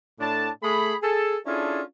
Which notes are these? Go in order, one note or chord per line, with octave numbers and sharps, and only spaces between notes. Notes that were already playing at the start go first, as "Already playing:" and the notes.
A2 D4 A5
A3 G#4 B5
G#4 A4
C#4 D4 E4 F4 G#4 A4